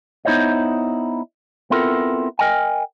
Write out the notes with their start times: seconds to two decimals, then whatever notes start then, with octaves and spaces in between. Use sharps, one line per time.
0.25 B3 D#4 E4 C5 C#5 D#5
1.70 B3 C4 E4 F4 A4 A#4
2.39 A#4 D#5 G5 G#5